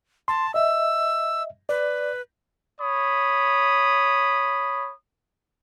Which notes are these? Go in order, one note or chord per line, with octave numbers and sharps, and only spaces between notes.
A5 C6
D#5 E5 E6
B4 D5
C#5 B5 D#6